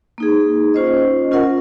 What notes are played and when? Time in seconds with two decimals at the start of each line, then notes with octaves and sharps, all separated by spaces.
0.18 A#3 D#4 G#4
0.74 C#4 F4 C5 D#5
1.31 C#4 F4 A#4 D#5 F#5